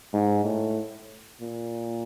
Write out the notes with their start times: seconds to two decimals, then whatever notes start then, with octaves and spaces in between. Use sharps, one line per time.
0.14 G#2
0.45 A2
1.41 A#2